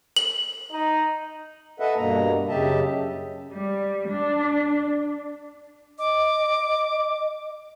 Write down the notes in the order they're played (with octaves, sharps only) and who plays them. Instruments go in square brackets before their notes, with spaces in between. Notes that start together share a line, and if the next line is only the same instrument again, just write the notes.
[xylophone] F#7
[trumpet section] D#4
[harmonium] A4 B4 D#5 E5 F#5
G2 B2 A#3 A#5
F#2 C#3 G4 D#5 E5 A5
[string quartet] G3
D4
[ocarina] D#5 [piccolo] D6